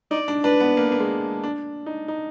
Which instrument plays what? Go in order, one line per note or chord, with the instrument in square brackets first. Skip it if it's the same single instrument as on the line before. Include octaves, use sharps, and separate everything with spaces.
[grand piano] D#4 [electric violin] D5
[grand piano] D4
[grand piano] D4 [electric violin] B4
[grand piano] B3
A#3
A#3
G#3
D4
D#4
D#4